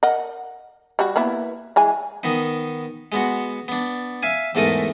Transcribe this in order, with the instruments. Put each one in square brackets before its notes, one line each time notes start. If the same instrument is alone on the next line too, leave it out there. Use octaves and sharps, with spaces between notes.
[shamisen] A#4 D#5 F#5
G3 F#4
A#3 B3 E4
E3 G#3 G#5
[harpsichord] D#3 B3 D#4
G#3 B3 F#4
B3 D4
E5 F5 G#5
E2 G#2 A3 A#4 D#6